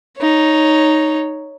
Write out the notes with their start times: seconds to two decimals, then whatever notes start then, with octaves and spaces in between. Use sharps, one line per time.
0.18 D#4 C#5